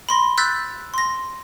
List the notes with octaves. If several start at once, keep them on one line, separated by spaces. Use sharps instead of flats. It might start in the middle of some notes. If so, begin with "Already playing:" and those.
B5 C6 A#6
E6 F#6 G6 A6 B6
C6 A#6